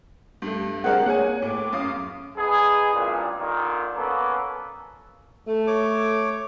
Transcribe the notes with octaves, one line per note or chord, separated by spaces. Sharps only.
G2 A3
G#3 C4 D4 G#4 A#4 F#5
A#3 G#4 C#5 F#5 G#5
A2 D6
F#2 F5 D#6
B3 D#4 G#4
A1 G2 A#2
A#2 D3 D#3
A#3 B3 C#4 A4 B4
A3
C#5 D6